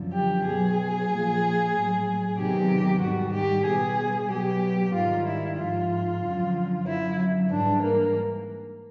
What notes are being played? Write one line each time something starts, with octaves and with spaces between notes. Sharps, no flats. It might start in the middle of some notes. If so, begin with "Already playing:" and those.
Already playing: F#2 D3 F3
G4
B2 F#3 G#4
A#2 F3
A2 F#3
E2 C3 D#3 F#3 G4
G#2 D#3 G3 F#4
G4
B2 G3 G#4
B2 F#3 G4
G#2 D#3 G3 F4
E4
G#2 F3 F4
F#2 D3 F3
F#2 D3 F#3 E4
G#2 E3 G3 D4
A#3